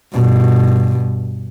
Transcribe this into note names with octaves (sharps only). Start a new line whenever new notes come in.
G2 B2